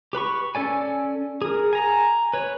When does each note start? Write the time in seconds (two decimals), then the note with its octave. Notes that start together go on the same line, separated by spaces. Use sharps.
0.13 G4 B4 B5 C#6
0.55 C#4 A4 D5 G#5
1.42 G#4 A#4
1.73 G#5 A#5
2.33 B4 C#5